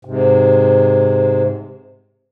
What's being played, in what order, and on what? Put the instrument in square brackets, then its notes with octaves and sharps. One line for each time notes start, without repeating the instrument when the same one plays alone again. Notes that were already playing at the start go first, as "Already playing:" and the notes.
[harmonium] G#2 C3